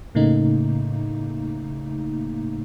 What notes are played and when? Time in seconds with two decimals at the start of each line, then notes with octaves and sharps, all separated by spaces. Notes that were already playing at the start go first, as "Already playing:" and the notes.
0.15 A2 C#3 A3 A#3 D#4